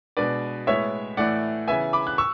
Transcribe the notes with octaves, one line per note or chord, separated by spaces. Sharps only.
B2 G#3 B3 D4 B4 D5
A2 G#3 B3 E4 C#5 E5
A2 E3 A3 D5 F#5
C#3 E3 B3 E5 G#5
B5 D6
F#6
C#6 E6